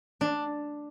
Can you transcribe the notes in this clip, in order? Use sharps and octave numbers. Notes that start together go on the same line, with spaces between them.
D4